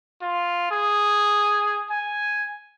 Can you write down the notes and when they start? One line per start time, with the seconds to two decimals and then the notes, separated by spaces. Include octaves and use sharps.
0.22 F4
0.71 G#4
1.90 G#5